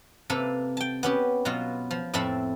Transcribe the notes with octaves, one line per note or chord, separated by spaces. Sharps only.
C3 A#3 A4 B4
G5 A5
B3 C#4 G4
B2 F#3 B3 F4
F3
F2 A2 C4 A4 E5 B5